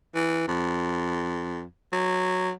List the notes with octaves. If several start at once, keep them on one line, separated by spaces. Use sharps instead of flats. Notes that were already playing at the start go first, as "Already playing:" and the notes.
E3
F2
F#3